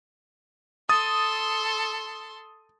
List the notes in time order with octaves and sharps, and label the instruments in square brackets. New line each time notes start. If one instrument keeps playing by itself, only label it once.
[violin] A4 C6 [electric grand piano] D#6 A6